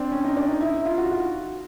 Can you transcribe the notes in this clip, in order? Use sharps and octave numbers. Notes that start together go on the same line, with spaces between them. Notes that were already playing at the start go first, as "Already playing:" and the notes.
Already playing: C4 D4
C#4
D#4
D4
D#4
E4
E4
F4
F#4
F#4